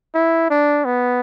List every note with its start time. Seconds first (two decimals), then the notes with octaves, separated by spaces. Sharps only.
0.14 E4
0.50 D4
0.85 B3